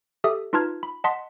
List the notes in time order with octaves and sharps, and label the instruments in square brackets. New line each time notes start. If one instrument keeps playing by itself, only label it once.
[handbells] G4 A4 E5 D#6
D#4 F4 B4 A5 F6 G#6
B5
D#5 F#5 A5 C6 B6